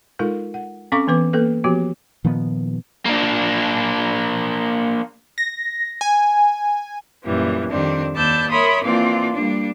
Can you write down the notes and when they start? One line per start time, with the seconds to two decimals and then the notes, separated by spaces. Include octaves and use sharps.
0.19 G#3 D#4 F4 A4 A#4
0.54 F#5
0.92 C4 C#4 A4 F5 C#6 D6
1.07 E3 B3 B4 D6
1.33 A#3 A4 B4
1.64 F3 B3 F#4 G4
2.24 A#2 D#3 F3 B3
3.06 A#3 D4
5.38 A#6
6.01 G#5
7.24 F#2 A#2 E3 G3
7.70 F2 D#3 G3 C4 D4
8.14 D#2 B4 D5 A5 E6 G6
8.49 A#4 C#5 E5 B5 C6 D#6
8.83 E3 F3 A#3 C4 F4 D5
9.32 G3 A#3 D4